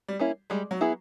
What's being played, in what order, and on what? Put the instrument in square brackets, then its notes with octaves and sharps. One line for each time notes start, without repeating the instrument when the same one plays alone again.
[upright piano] G3
[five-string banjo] A#3 C#4 E4
[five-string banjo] G3 [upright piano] G#3
[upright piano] F#3
[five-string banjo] B3 E4 G#4